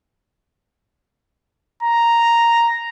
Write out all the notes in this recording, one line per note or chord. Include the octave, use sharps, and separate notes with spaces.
A#5